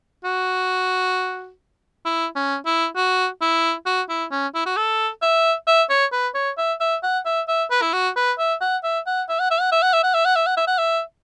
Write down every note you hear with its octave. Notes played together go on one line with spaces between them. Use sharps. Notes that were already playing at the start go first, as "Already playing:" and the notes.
F#4
E4
C#4
E4
F#4
E4
F#4
E4
C#4
E4
F#4
A4
E5
E5
C#5
B4
C#5
E5
E5
F#5
E5
E5
B4
E4
F#4
B4
E5
F#5
E5
F#5
E5
F#5
E5
F#5
E5
F#5
E5
F#5
E5
F#5
E5
F#5
E5
F#5
E5